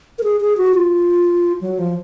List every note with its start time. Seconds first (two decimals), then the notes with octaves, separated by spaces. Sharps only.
0.18 A#4
0.24 G#4
0.41 G#4
0.57 F#4
0.75 F4
1.61 F#3
1.79 F3